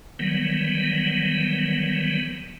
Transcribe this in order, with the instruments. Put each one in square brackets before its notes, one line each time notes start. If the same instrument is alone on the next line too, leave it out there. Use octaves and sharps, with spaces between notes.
[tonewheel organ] D#3 E3 F#3 G3 B3